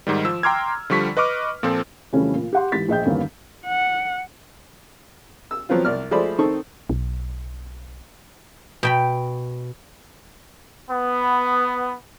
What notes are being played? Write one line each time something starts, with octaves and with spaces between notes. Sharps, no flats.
G#2 D#3 G3
F3 E6
G5 A#5 C6 D6 F6 G#6
D3 F3 G3 C#6 B6
B4 D#5 C#6 D6 F6
A#2 F3 C4 A4
F2 C#3 E3 G3 A3 C#4
A#2
G4 F#5 C6
G#2 E3 G4 A6 B6
A#1 G#4 D#5 G5 G6
E2 G2 D3 D#3 A#3 C#4
F#5
E6
F3 F#3 B3 C4 F4
C2 D5 F6
F3 G#3 A3 C5 D5 B5
D#3 C4 D#4 A4 C#6
B1
B2 G5 B5
B3